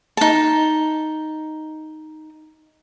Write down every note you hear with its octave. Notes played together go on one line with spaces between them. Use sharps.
D#4 A5